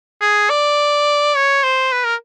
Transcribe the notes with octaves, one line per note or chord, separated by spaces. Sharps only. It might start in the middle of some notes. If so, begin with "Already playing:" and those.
G#4
D5
C#5
C5
B4
A#4